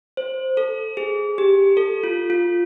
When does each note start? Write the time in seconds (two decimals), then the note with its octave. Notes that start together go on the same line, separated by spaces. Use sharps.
0.17 C5
0.57 A4
0.97 G#4
1.38 G4
1.77 A4
2.04 F4
2.30 F4